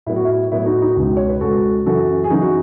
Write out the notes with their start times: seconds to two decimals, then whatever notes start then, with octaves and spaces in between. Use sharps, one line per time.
0.06 A2 F#3 B3 E4
0.16 F#4
0.25 E4
0.51 A2 F#3 B3 E4
0.66 D#4 F#4
0.81 D#4 F#4
0.96 C#2 B2 G#3
1.17 C#5
1.29 B4
1.41 C#2 B2 G#3 F#4 A4
1.86 F#2 C#3 E3 F#4 A4
2.24 G#4
2.30 F#2 C#3 E3 D#4 F#4
2.42 F#4